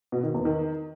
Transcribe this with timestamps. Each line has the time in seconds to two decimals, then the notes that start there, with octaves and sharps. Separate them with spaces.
0.12 B2
0.23 D#3
0.34 E2
0.45 D#3